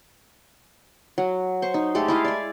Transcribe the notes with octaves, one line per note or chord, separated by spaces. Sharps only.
F#3
C5 C#6
D#4
G#3 A3 G4 A4
E4 D#5 F5
D5 G#5